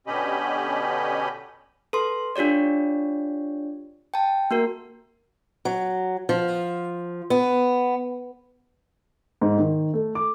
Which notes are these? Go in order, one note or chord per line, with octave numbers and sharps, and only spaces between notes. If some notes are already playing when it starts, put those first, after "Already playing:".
B2 D3 C#4 G4 D#5 B5
A4 B4 C6
D4 F4 G4 C#5 D5
G5 A5
A#3 F#4 A#4
F#3
F3
B3
G#2
D#3
A3
D6